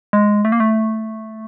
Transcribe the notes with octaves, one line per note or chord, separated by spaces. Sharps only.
G#3
A3
A#3
A3